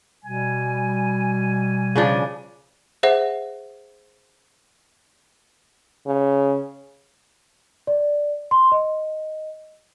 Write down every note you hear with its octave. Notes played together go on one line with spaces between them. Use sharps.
B2 G3 G#5
C#3 F3 D4
G#4 C5 E5 F#5
C#3
D5
C6
D#5